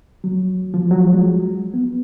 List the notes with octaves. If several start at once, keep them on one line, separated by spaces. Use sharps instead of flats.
F#3
F3
F#3
G#3
B3